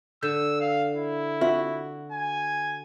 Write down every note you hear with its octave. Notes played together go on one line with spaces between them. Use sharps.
D3 E6 G6
F5
E4
C4 F4 F#4 E5
G#5